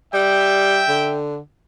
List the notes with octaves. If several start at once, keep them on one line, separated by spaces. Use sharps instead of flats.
G3 E5 G5
D3